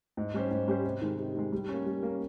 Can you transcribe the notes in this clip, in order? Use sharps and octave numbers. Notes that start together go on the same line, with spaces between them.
G#2
G3 C#4 G4 C5
G#2
G3 C#4 G4 C5
C3
D#3 G#3
C3
D#3 G#3
G3
A#3 C#4
G3
A#3 C#4